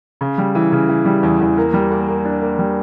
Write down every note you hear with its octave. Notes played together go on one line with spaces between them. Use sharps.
C#3
G3
E3
C#3
E3
G3
E2
E2
A#3
G3
A#3
A#3
D4
A#3
G3